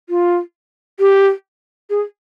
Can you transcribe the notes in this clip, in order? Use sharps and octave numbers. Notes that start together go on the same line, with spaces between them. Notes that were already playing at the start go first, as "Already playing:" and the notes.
F4
G4
G#4